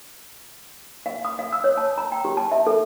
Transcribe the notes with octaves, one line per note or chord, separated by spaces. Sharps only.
F5
D#6
F5
E6
C#5
A5
A#5
G5
G4
A5
E5
A4